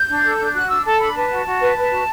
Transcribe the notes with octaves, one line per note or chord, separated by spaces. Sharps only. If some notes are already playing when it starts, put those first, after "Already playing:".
Already playing: G6
D4
A4
D4
F#4 F#6
D4 E6
A4 A5
D4 B5
B4 A5
F#4
F#4
B4
B4
F#4